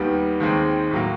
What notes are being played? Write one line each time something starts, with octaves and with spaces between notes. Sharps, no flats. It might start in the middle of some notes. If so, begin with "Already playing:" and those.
Already playing: D#2 D#3 G3 B3
D#2 D#3 G#3 C4
A2 F#3 A#3